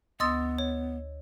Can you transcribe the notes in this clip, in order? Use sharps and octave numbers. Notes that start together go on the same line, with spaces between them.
D2 B3 D#5 C6 D#6 E6 A6
C#5